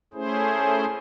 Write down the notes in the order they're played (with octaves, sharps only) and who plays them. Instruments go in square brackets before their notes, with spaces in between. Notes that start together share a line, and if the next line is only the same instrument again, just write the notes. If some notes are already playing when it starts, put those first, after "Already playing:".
[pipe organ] A3 C#4 E4 G#4 C5